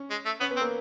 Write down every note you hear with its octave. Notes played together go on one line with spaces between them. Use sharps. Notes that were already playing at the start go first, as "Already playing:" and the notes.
Already playing: C#4
G#3
A3
B3 C#4
B3
C4
A#3